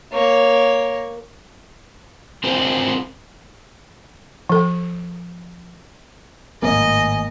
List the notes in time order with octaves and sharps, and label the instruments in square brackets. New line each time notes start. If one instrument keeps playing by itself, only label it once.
[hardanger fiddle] A#3 C#5
[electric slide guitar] C4 F4 G#4 A#4 C5
[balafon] F3 A4
[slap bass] G#1 A2 F#3 [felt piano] A#3 [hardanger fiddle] D#5 [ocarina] G#5